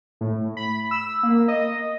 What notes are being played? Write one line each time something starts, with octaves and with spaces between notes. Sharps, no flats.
A2
B5
E6
A#3
D#5